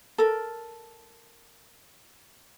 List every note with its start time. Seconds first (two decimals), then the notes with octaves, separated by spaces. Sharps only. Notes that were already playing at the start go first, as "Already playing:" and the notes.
0.18 A4 A#4